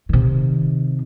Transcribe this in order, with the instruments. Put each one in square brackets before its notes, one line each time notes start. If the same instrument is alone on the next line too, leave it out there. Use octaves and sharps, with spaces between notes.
[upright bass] C3 D#3